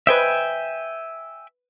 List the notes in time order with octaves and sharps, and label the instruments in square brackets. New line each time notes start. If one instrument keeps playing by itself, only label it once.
[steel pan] B4 C5 D#5 [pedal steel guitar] E5 G5 G#5